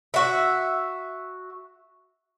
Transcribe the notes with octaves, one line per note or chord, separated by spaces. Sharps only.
F#4 E5